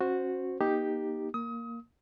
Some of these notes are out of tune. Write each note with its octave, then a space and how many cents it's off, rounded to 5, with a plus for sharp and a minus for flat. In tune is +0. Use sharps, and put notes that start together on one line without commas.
C#4 -30 F#4 -10 C5 +0
A#3 +35 D#4 +0 G4 +0
A#3 +0 D#6 +30